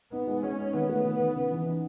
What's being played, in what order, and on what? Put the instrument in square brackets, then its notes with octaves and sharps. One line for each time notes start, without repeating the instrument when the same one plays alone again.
[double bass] B3 [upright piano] D#4
[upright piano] G#3
[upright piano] G#3 [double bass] C#4
[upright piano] D#4
[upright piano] D#3 [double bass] B3
[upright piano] A3
D#3
D#3
C#3
E3
D#4